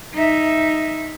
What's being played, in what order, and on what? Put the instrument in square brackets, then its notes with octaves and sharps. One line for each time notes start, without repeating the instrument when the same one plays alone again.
[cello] D#4 E5